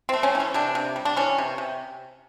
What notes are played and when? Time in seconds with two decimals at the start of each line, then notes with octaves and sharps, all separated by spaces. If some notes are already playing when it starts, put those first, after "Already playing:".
0.09 C4
0.13 A3
0.23 C#4
0.35 E3
0.40 C#4
0.54 C3 D4
0.75 C3
0.96 G3
1.05 D4
1.16 E3 C#4
1.38 C3
1.58 C3